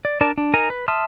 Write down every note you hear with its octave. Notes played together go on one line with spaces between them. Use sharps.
D5
D4 A#4 D5 A5
D4
D#4 A#4 G#5 A#5
B4
E5 A5 C6 D#6 F6